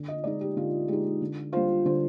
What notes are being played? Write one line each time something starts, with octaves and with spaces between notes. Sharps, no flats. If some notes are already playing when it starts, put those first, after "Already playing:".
Already playing: D3
D#5
G#3 D#4 D5
G4
D3 F4
G#3 D#4 G4
D3
G3 D4 F4 C5
D3 C5